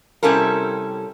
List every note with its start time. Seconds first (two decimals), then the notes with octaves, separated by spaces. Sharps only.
0.23 C3 G3 C#4 E4 A4 A#4